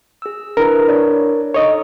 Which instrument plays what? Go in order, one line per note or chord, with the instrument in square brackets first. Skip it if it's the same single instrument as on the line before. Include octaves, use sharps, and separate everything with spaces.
[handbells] G#4 E6
[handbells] D4 E4 B4 [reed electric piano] A#4
[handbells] D4 C#5 D5
[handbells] D#4 A4 [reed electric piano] C#5 D#5